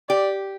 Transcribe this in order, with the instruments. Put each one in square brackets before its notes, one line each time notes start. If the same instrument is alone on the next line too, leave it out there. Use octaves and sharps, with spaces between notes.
[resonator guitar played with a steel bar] G4 [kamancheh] D5